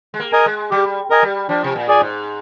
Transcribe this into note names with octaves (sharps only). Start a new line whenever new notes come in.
G#3
A#3
A#4 D#5 G#5
G#3
G3 G4
A#4 D#5 G#5
G3
F3 D4
C3
A#2
G#4 D5 G#5
G#2